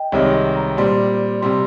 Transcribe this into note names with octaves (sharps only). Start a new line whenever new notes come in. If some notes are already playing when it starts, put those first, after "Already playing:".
Already playing: D#5 G5
C2 C3 D#3 G#3 C#5
D#5
A#5
A#2 G3 C4 C6
C3 G3 C6